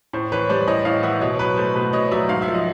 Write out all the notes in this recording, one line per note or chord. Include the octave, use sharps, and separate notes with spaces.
A2 C5
E3 B4 C#5
G3 C5 D5
A2 C#5 D#5
A2 D#5 F5
E3 E5 F#5
B2 C#5 D#5
F#3 B4 C#5
A3 C5
B2 B4
B2 C#5 D#5
F#3 D5 E5
G#2 F5
E5
F3
D#5